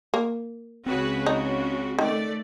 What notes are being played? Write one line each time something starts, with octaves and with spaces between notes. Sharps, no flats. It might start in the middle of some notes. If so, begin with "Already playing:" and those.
A#3
C#2 C#3 C4 F#4 G#4 B4
D#4 F#4
D#3 A3 D5